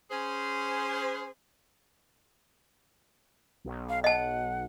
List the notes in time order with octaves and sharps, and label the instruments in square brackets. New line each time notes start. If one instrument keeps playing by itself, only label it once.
[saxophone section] C#4 G#4 C5
[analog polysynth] B1
[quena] F5
[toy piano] D#5 A5 [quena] F#5